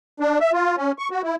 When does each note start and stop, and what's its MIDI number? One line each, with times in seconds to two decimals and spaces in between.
0.20 0.39 62
0.40 0.52 76
0.53 0.76 65
0.77 0.92 61
0.99 1.08 85
1.11 1.22 66
1.23 1.35 64